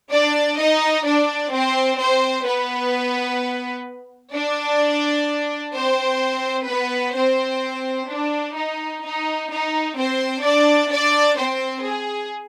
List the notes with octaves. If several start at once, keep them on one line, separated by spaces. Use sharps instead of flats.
D4 D5
D#4 D#5
D4 D5
C4 C5
C4 C5
B3 B4
D4 D5
C4 C5
B3 B4
C4 C5
D4
D#4
D#4
D#4
C4 C5
D4 D5
D4 D5
C4 C5
G#4